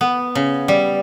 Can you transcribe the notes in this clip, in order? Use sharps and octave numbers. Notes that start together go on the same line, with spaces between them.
B3
C#3
G3